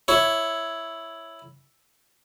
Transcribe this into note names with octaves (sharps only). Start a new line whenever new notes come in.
E4 C#5